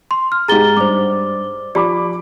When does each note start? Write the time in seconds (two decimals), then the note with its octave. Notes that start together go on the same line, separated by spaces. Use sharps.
0.11 C6
0.32 F6
0.48 G#2 G4 G#4 A#5 A6 G7
0.77 G2 C5 D6
1.75 F3 G4 D5 B5 D6